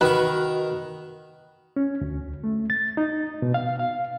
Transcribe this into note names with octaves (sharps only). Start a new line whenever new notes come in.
D#3 F#4 B4 C#6
C#4
D2
A3
A6
D#4
B2
F5
F5